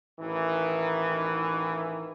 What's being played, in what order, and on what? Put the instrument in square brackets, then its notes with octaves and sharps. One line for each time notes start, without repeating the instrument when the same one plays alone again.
[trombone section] A1 D#3 E3